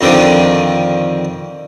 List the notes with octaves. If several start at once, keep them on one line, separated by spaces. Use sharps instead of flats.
F2 D3 D#3 F3